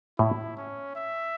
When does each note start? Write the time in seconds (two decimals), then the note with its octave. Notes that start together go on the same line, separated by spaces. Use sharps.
0.19 A2 E4
0.57 C#4
0.96 E5